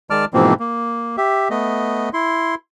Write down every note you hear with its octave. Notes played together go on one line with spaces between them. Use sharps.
D#3 G#3 D5 A5 D6 F6
G#2 B2 E3 F3 A#3 C4
A#3
G4 E5
A3 B3 D#5
E4 C6